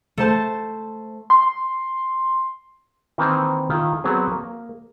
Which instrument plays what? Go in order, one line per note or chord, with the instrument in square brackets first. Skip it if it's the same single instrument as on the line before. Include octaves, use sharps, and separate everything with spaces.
[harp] A3 C5 A5
[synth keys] C6
[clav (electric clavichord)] D#3 E3 A#3 C4 C5
D#3 E4 F4
F#3 B3 C4 G#4
A#3